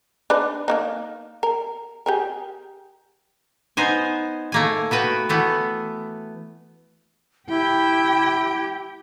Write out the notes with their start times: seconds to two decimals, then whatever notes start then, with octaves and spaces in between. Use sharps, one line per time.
0.30 D4 D#4 B4
0.68 A#3 D4 D#4
1.43 A#4
2.06 G4 G#4 A#4
3.77 B3 D#4 C5 G#5
4.52 A3 A#3 G#5
4.91 B3 F#4 B4 G5
5.29 E3 A3 B3
7.48 E4 G4 G5